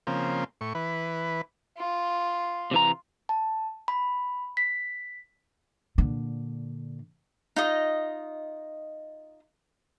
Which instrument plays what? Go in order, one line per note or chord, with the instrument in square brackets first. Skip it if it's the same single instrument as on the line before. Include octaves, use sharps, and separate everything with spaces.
[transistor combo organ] C#3 F3 A#3 C4
A2 C#6
E3 B4
[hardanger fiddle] F4
[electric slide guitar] C3 E3 A#5
[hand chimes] A5
B5
B6
[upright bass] A#2 D3
[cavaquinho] D#4 F4 D#5